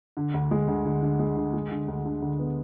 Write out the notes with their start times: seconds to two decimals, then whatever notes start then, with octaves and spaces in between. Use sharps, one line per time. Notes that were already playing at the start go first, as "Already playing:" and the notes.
0.17 D3
0.34 D2
0.51 G#3
0.68 D2
0.85 D3
1.02 D3
1.19 G#3
1.37 D3
1.53 G#3
1.71 D3
1.88 D2
2.05 D3
2.22 D2
2.39 B3